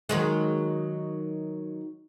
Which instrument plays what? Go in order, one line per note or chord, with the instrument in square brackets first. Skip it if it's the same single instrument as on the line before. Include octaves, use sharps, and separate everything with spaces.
[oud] D#3 F#3 G#3